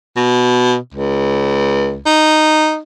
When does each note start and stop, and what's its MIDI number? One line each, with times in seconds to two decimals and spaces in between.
0.16 0.77 47
0.94 2.01 37
2.06 2.79 63